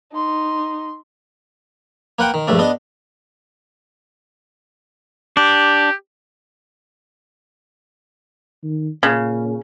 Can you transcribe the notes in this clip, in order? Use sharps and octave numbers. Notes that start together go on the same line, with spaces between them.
D#4 C6
A#3 B4 F#5 G5
D#3
A#1 G2 A3 D4
B3 D4 D#5
D4 G4
D#3
A#2 C#3